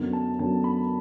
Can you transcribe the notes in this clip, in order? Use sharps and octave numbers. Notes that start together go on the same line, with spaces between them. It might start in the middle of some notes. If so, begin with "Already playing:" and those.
Already playing: F#2 D3 F#3 B3
A5
F#2 D3 F#3 B3 A5
B5